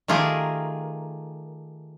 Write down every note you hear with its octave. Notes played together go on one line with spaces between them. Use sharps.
D#3 A3 F4 G4 G#4 A#4